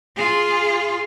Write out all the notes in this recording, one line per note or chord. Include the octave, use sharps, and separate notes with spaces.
F4 G#4